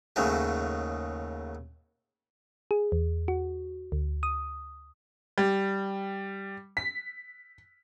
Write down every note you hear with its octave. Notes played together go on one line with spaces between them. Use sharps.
D#2 G#2 C#3 F#3 A3
G#4
E2
F#4
D2
D#6
G3
B6